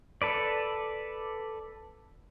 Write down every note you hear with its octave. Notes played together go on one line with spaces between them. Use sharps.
A4 B4 D5